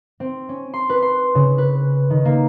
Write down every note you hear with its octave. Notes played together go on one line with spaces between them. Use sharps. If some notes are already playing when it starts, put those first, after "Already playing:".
C4
C#4
C6
B4
C6
C#3
B4
D#3
A#3